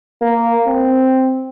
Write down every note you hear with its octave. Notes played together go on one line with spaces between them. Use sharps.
A#3
C4